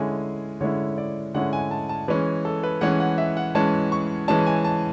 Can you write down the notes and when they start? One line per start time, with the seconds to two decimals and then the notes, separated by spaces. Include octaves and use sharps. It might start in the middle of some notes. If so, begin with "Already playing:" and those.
Already playing: D3 G#3 C#4 E4 G#5
0.61 D3 G#3 C#4 E4 C#5
0.98 D5
1.34 D3 G#3 C#4 E4 F#5
1.53 G#5
1.71 A5
1.89 A5
2.08 E3 G#3 C#4 B4
2.45 A4
2.63 B4
2.81 E3 G#3 C#4 F#5
3.00 F#5
3.18 E5
3.37 F#5
3.55 E3 G#3 C#4 A5
3.92 C#6
4.28 E3 G#3 C#4 A5
4.46 G#5
4.64 A5